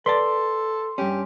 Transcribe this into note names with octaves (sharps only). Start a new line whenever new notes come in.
A4 B4 D5 A5 C6
G2 C#4 G4